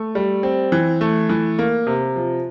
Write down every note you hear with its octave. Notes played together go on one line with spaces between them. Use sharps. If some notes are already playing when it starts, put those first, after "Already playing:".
Already playing: A3
G3
C4
E3
A3
E3
A#3
C3
F3